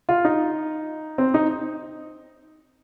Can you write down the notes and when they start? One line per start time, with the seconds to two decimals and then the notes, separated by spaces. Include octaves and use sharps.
0.09 F4
0.25 D#4
1.18 C4
1.34 D#4